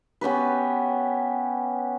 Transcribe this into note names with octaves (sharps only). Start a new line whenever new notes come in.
B3 C#4 G4 B4